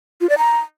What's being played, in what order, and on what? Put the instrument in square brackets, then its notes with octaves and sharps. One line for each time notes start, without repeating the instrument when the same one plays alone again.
[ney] F4
D5
A#5